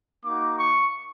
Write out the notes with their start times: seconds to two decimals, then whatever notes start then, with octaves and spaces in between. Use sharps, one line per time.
0.25 A#3 D#4 F#4 D6
0.57 C#6